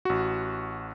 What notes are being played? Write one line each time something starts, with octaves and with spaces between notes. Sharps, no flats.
A1 F#4